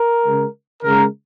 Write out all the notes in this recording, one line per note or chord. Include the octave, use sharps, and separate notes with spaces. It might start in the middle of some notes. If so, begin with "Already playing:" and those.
Already playing: A#4
C#3 G#3
C#3 G#3 A#4